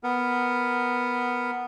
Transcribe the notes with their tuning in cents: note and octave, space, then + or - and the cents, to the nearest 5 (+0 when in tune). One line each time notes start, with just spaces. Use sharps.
B3 +0 A#4 +0